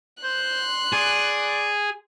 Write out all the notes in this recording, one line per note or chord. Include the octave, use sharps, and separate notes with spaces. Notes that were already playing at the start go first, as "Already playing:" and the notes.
C5 C6 F#6
G#4 D5